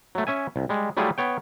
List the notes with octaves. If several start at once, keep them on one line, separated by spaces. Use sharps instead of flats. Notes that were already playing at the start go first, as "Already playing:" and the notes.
F#3 A3
C#4 E5 G#5
C2
G3 G#3
F#3 G3 A3 E4 F4 G#4
B3 C#5 G5